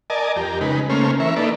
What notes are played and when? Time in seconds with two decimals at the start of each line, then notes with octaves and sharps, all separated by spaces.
0.10 A#4 D5 D#5 G#5 A5
0.36 F2 G4 A#4
0.61 C#3 G#3 D#4 B4
0.90 C#3 A3 A#3 C#4 C5 F6
1.20 E3 A#4 E5 C#6
1.36 A#3 D#4 A4 B4 D5 E5